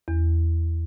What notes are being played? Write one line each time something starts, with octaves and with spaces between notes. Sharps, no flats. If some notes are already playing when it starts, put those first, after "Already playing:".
E2